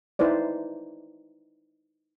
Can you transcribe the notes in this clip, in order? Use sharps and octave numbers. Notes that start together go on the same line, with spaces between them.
D#4 E4 B4 C5 D5